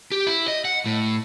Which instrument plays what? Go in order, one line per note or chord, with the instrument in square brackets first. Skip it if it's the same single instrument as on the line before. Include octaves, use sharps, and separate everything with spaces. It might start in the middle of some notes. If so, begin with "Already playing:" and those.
[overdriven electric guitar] G4
E4
D#5
F#5
A2